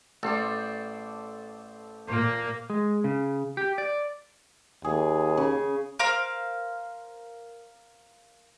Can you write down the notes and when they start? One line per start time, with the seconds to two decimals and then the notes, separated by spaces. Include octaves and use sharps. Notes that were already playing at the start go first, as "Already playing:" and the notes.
0.23 A1 A4 C5 D5
2.08 A#2 A#3 C5 G5
2.70 G#3
3.04 C#3
3.57 G4
3.78 D5
4.84 D#2 G#4
5.37 C#3
5.99 A#4 C5 F5